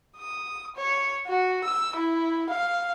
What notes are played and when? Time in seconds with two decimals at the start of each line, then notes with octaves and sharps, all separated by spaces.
0.18 D#6
0.76 C#5
1.27 F#4
1.64 E6
1.96 E4
2.50 F5